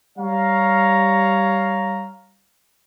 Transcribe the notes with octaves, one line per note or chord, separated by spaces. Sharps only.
G3 C#5 F5 A#5